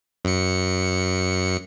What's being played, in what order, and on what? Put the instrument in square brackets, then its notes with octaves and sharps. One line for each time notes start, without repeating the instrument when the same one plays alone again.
[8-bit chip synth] F#2 C#7